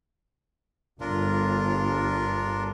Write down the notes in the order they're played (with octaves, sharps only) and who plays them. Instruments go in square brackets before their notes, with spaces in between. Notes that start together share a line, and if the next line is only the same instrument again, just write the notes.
[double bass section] G1 [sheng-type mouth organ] D4 F4 A#4